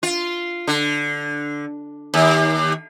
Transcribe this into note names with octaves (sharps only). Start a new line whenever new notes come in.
F4
D3
D#2